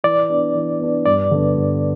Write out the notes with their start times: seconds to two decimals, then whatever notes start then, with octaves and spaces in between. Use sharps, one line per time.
0.04 E3 D5
0.30 B3 D4
0.55 E3
0.80 B3 D4
1.06 G2 D5
1.31 D3 B3
1.57 G2